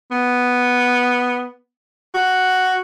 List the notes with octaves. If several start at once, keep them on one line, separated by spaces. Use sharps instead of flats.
B3
F#4